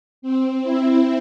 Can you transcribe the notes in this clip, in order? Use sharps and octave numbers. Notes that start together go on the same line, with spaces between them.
C4
E4